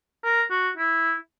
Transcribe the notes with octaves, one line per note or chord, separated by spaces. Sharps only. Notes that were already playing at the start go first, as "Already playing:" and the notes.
A#4
F#4
E4